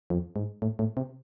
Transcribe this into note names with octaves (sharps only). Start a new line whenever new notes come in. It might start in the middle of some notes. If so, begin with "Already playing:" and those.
F2
G#2
A2
A2
C3